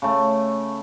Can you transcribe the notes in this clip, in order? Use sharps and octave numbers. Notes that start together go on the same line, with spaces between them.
C#3 A3